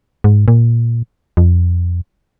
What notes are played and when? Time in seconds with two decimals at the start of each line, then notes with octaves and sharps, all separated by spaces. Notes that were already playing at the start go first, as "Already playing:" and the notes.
0.24 G#2
0.48 A#2
1.37 F2